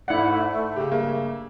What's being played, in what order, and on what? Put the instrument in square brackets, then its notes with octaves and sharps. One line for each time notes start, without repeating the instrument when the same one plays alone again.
[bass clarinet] G#2 [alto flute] A3 [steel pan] E4 F#5 [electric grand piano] D5
[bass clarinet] C#3 [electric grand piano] G4
[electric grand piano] G2 A#3 E5